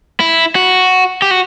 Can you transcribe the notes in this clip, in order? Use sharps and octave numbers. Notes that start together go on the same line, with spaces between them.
E4
F#4
G4
F#4